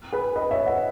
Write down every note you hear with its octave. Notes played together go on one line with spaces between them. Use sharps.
G#4 B4
B4 D#5
C#5 E5
D#5 F#5